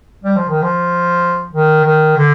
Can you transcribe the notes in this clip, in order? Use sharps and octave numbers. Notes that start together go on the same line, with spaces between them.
G3
F3
D#3
F3
D#3
D#3
D3